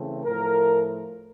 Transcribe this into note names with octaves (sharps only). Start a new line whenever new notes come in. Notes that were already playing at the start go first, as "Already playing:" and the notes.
Already playing: C#3 E3 A3 C4
A2 F3 A3 A#4